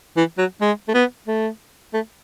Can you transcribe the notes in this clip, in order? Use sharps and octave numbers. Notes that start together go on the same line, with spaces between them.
E3
F#3
G#3
A3
B3
A3
A3